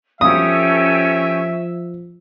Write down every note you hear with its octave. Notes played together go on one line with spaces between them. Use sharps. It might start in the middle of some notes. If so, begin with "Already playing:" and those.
F3 C#4 G4 A4 E5 D#6